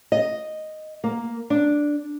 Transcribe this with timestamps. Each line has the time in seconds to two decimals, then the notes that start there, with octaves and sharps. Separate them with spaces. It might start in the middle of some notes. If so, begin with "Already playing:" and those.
0.12 D#5
1.04 A#3
1.50 D4